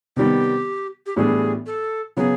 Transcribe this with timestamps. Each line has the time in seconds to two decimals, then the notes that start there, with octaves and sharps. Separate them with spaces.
0.17 C3 D#3 G3 B3 G4
1.06 G4
1.16 A2 E3 G3 B3 D4 G#4
1.66 A4
2.17 C#3 F#3 B3 G#4